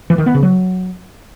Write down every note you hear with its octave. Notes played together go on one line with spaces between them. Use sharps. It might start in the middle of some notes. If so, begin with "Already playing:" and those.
E3
D#3
B3
C#3
F#3